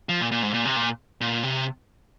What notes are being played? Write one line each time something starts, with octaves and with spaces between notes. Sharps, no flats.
F3
A#2
A#2
G#2
A#2
C3
A#2
A#2
C3